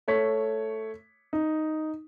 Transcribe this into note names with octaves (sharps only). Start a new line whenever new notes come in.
A3 C#5 B6
D#4